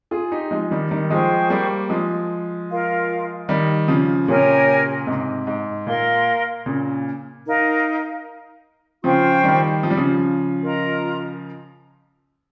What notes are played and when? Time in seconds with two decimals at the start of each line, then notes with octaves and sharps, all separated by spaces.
0.11 F4 G#4
0.32 D#4 G4
0.51 F3 G#3
0.71 D#3 G3
0.91 D#3 G3
1.10 F3 G#3 G#4 C5 G5 C#6
1.50 G3 A#3
1.90 F3 G#3
2.70 F4 A#4 F5
3.49 D#3 G3
3.88 C#3 F3
4.28 A#2 C#3 G4 A#4 C#5 G#5
5.07 G#2 C3
5.47 G#2
5.87 A#2 A#4 F5 C6
6.66 A#2 C#3
7.46 D#4 A#4 F5
9.03 C#3 F3 F4 C5 G5 C#6
9.44 D#3 G3
9.83 F3
9.90 G3
9.97 C#3 F3
10.62 F4 A#4 D#5 A#5